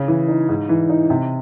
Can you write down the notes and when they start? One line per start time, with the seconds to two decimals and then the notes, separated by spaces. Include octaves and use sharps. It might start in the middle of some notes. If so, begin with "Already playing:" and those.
Already playing: C#3
0.08 E3
0.28 D#4
0.49 G#2
0.69 E3
0.90 D#4
1.10 C3